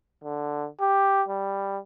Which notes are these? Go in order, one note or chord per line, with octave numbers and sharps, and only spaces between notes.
D3
G4
G3